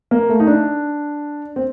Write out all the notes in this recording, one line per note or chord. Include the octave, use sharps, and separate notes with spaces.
A#3
A3
D#4
D4
C4